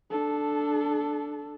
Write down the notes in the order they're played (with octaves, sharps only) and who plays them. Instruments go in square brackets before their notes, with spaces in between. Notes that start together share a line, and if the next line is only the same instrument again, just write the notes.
[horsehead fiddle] D4 A4